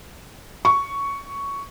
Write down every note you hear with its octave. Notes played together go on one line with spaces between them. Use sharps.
C#6